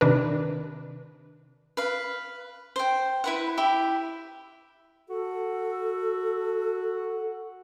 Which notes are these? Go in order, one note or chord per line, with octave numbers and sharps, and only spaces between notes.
C3 D#3 D4 A#4 B4
B4 F5
C5 G5
E4 B4 F#5
E4 G4 E5
F#4 A4